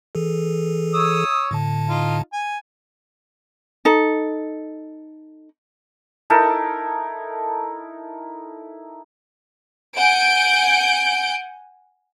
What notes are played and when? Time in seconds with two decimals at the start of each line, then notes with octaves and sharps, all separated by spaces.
0.15 E3 G#4 A4
0.94 C#5 D#6 E6
1.51 A2 D3 A5
1.89 D#4 F4
2.33 G#5
3.85 D#4 A4
6.30 D#4 E4 A4 A#4
9.96 F#5 G#5 G6 D7